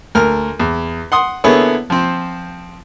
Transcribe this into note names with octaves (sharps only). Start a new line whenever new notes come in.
D2 A#4 F6
E2
F#5 C6 D#6
D3 A#3 B3 E4 G#4 C#5
F3 C4